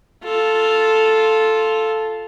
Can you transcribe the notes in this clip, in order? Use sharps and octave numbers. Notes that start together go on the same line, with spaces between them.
F4 A4